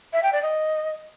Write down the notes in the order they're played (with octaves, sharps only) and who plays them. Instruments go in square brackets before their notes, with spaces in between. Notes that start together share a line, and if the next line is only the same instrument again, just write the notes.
[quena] E5
G5
D5
D#5